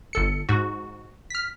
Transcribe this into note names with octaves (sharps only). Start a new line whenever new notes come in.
G1 A4 C#7
G#2 F#4
F6 B6